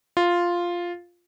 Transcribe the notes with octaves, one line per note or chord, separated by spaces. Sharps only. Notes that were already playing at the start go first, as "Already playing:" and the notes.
F4